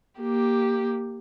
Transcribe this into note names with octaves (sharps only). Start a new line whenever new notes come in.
A#3 G4